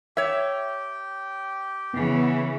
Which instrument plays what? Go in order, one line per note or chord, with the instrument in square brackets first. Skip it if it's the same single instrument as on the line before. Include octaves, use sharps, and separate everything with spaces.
[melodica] G4 G5 [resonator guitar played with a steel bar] C#5 E5
[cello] C#3 E3 [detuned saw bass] B3